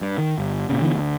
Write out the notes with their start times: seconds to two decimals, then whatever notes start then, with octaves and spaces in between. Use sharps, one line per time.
0.01 G2
0.18 D#3
0.38 G1
0.69 A#2 C#3
0.82 D3 E3 A#3 B3
0.95 D2